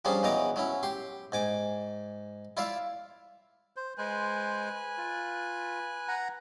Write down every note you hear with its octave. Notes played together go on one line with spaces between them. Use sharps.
F3 G3 C#4 D4 G#4
E2 E3 F#3 D#5 A#5 D6
F#3 C#4 E4
G4 C6
G#2 G#5 D6
E4 F4 D5 E5 F5
C5
G#3 B4 C5 G#5 F#6
F4
F#5 A#5